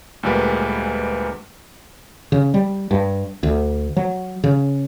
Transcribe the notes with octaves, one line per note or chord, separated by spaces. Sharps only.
D2 A#2 G3 G#3 A#3 B4
C#3
G3
G2
D2
F#3
C#3